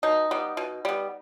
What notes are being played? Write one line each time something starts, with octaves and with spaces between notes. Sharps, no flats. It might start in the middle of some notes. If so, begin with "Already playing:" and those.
B2 D#4
G3 B3
B2
G3 B3